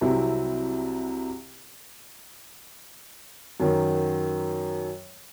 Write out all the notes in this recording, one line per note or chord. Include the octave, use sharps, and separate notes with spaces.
C2 C3 F#3 C4 E4
F#2 D#3 F#3